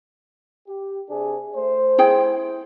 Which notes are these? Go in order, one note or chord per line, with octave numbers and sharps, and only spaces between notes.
G4
C3 D4 G#4
A3 C5
E4 G#4 G5